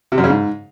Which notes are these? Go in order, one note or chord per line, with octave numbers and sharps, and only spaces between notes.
C3
F#2
C#3
G#2